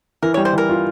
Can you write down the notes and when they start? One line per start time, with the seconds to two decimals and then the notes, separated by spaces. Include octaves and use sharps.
0.23 E3 A#4
0.34 C#5
0.37 G3
0.45 C5
0.53 E3 A#4
0.69 F4